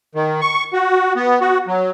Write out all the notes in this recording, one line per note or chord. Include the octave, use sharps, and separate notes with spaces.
D#3
C#6
F#4
B3
F#4
F#3